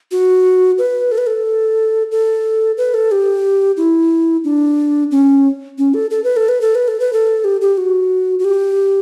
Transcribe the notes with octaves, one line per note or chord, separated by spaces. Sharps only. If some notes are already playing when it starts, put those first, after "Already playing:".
F#4
B4
A4
B4
A4
A4
B4
A4
G4
E4
D4
C#4
C#4
A4
A4
B4
A4
B4
A4
B4
A4
B4
A4
G4
G4
F#4
F#4
G4